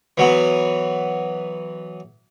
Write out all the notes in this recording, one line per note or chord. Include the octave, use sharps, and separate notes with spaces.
E3 F#3 B3